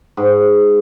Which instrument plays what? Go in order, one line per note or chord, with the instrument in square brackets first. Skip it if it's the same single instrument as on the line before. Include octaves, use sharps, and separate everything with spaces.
[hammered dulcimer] G#2